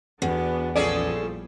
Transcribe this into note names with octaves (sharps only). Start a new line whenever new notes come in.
E2 B3 D4 F#4
A#1 F3 G3 C#4 G#4 A4 D5